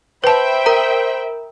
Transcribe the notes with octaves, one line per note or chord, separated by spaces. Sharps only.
B4 C5 E5 G5 A5 B5
A#4 A#5